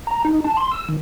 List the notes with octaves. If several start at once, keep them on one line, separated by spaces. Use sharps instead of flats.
A#5
D#4
A5
C6
E6
D#3